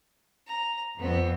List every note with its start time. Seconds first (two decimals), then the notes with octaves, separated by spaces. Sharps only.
0.47 A#5
0.98 F2 B3 C4